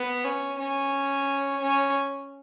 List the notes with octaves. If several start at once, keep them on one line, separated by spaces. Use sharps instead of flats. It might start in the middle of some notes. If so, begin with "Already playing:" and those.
Already playing: B3
C#4
C#4
C#4